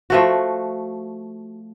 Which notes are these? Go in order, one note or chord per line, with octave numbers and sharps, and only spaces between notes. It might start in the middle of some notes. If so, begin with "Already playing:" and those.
F3 A3 F#4